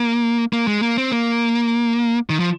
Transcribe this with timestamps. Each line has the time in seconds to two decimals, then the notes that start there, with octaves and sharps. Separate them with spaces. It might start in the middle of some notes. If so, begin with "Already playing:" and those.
Already playing: A#3
0.53 A#3
0.68 G#3
0.82 A#3
0.97 C4
1.12 A#3
2.30 D#3
2.40 F3